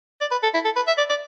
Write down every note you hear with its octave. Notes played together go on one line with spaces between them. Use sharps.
D5
B4
A4
E4
A4
B4
E5
D5
D5